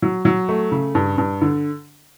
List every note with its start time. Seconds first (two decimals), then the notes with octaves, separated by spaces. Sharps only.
0.02 F#3
0.25 F#3
0.49 A3
0.72 C#3
0.95 G2
1.18 G2
1.41 D3